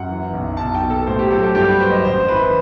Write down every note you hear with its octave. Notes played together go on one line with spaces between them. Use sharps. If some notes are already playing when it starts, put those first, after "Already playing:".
Already playing: F#2 F#5
E3
B1
B1 A5
G5
B2
A4
A2 C5
G4
F#3 A4
G4
G2 G4
B4
F#3 C5
D#5
A1 C5
E3 B4